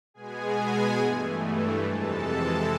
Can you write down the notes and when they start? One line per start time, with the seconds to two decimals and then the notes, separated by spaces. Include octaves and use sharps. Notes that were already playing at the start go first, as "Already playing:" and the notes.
0.14 B2 G#3 B3 G#4 G#5
0.99 G2 E3 A3
1.84 F2 C3 E3 G#3 A4 A5